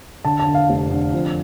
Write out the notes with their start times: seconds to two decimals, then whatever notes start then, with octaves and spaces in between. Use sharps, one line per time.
0.25 D3 A5
0.40 A5
0.47 D3
0.54 F5
0.69 F1
0.90 D3
1.13 F2